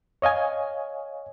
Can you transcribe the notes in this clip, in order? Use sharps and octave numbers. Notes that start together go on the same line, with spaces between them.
C#5 D#5 F5 G#5